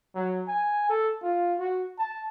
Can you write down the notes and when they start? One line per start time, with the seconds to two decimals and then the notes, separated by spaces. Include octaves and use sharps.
0.15 F#3
0.48 G#5
0.89 A4
1.23 F4
1.59 F#4
1.98 A5